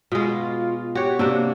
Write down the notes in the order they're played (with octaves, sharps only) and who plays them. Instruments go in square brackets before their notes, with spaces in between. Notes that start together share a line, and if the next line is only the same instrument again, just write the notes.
[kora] B2 G#3 [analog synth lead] F4
[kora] F#4 C#5 [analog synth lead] G4
[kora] C3 D4 F#4 [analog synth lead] A#3